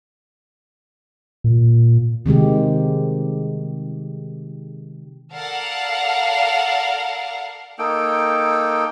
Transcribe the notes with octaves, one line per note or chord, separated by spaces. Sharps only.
A#2
C3 D#3 G#3 G4
A4 A#4 D5 F5 F#5
A#3 D#4 A4 G5